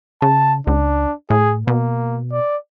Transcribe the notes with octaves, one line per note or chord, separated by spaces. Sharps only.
C#3 A5
C#2 D4
A2 G#4
B2 A#3
D5